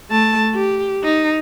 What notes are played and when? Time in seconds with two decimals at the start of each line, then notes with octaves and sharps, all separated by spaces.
0.10 A3 A5
0.55 G4
1.04 D#4